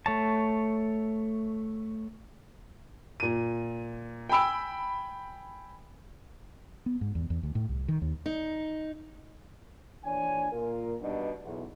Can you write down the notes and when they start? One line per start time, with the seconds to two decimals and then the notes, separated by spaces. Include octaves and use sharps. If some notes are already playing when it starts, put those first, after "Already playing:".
0.06 A3 C#5 A5
3.20 A#2 D#7
4.29 G5 G#5 B5 E6 D7
6.86 B3
7.01 G#2
7.15 E2
7.30 E2
7.43 D2
7.55 A2
7.69 C2
7.88 D#3
8.02 D#2
8.26 D#4
10.05 A#1 E3 D4 C#5 G#5
10.52 A#2 F4 A#4
11.01 G2 B2 D4 D#4
11.44 B1 E2